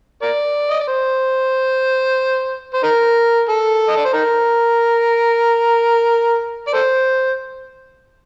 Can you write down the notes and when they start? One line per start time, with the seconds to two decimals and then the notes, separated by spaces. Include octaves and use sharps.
0.22 A#4 D5
0.70 D#5
0.80 D5
0.88 C5
2.74 C5
2.83 D#4 A#4
3.49 A4
3.89 D#5
3.97 D5
4.05 C5
4.13 D#4 A#4
6.68 D5
6.74 A4 C5